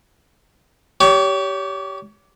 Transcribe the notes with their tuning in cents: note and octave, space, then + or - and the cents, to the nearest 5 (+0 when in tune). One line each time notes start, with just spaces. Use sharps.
G4 -10 C#5 +30